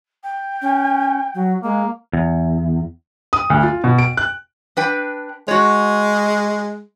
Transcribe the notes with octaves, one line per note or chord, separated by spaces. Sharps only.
G5
C#4
F#3
G#3 A#3
E2
D#6
D2
F4
B2
D7
F#6
D4 B4 G5
G#3 F#4 C#5